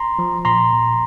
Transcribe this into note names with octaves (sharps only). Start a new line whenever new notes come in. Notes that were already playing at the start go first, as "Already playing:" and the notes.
Already playing: A#5 C6
F3
A#2 A#5 C6
A#2